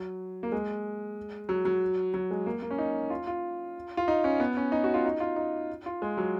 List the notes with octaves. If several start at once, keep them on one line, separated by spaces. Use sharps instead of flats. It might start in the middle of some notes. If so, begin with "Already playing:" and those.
Already playing: F#3
A#3
G#3
F#3
F#3
F#3
G#3
A#3
A#3
C#4
D#4
F4
F4
F4
D#4
C#4
B3
C#4
D#4
F#4
F4
D#4
F4
D#4
F4
G#3
F#3